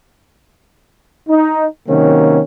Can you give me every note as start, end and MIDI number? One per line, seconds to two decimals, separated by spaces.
1.29 1.66 63
1.88 2.41 48
1.88 2.41 51
1.88 2.41 54
1.88 2.41 58
1.88 2.41 61